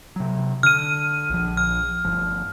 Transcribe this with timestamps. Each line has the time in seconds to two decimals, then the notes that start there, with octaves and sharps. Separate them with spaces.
0.16 C3 F#3
0.63 D3 F6 D#7
1.30 A#1 F3
1.57 F6
2.05 G1 F3